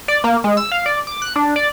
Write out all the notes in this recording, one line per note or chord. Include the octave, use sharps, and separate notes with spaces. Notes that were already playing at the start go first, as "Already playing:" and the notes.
D5
A#3
G#3
E6
F5
D5
D6
F#6
D4
D5